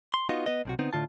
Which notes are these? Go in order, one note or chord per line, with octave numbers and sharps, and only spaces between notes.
C6
B3 D#4 F4 F#4 D#5
B3 B4 D#5
B1 C3 F#4
D3 B3 C4 D#4
A2 D3 F4 A5